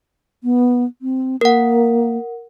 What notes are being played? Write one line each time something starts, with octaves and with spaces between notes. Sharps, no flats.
B3
C4
A#3 A#4 F#5